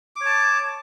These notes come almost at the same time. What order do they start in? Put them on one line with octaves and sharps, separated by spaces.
D6 C#5 A5